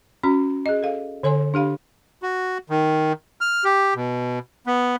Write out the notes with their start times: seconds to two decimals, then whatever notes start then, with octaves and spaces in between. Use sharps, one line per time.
0.23 C#4 F#4 A#5
0.66 G#4 D#5
0.82 A4 F5
1.23 D3 A4 C#5 G#5 C6
1.54 D4 G4 F5 B5
2.23 F#4
2.70 D#3
3.41 F6
3.64 G4
3.95 B2
4.67 B3